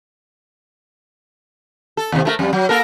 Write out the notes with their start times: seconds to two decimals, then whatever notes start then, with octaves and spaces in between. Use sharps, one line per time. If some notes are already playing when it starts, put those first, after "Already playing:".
1.97 A4
2.12 D#2 C3
2.25 A3 E4 A#4
2.39 F2 G3
2.53 F#3
2.69 A#3 A4 A#4